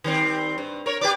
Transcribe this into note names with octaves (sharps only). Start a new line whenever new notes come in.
D#3 G3 C4
G2
A#4 C#5
G4 B4 D5